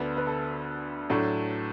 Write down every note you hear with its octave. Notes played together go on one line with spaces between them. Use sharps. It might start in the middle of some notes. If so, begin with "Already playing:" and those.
Already playing: D2 D3 B3 D4
B4
A4
A2 F#3 A3 D4